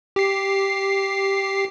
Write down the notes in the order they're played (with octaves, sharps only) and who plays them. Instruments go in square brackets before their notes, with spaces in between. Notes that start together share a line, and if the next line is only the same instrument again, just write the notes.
[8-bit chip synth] G4 C7